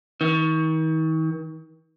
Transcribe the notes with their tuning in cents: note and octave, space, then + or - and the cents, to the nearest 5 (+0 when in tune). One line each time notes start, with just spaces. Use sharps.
D#3 +40